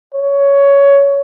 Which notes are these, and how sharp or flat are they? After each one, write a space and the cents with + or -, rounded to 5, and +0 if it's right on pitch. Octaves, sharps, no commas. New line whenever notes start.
C#5 +15